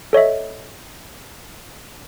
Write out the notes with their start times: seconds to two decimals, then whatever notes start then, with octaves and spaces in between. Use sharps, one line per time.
0.13 A4 C#5 D#5 E5